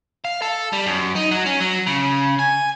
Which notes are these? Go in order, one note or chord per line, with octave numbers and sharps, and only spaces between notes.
F5
A4
G3
F#2
D#4
F#3
C#4
F#3
C#3
G#5